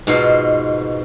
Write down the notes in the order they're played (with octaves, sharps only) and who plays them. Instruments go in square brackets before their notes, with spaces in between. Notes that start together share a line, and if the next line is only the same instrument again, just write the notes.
[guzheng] G#2 B2 F4